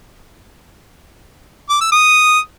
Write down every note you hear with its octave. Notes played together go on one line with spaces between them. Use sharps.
D6
E6
D#6